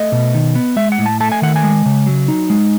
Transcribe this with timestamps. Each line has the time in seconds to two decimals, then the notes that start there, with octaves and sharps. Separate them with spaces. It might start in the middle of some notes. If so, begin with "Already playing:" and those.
Already playing: A3 D#5
0.12 B2
0.34 D#3
0.55 B3
0.76 G#3 E5
0.92 F#5
0.98 A2
1.06 A5
1.20 A3 A5
1.32 G#5
1.42 D#3 F#5
1.56 G#5
1.64 G#3
1.86 C#3
2.07 F#3
2.28 D#4
2.50 G#3